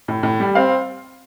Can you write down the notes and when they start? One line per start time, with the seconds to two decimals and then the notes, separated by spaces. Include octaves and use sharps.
0.08 A2
0.23 A2
0.40 G3
0.55 C4 F5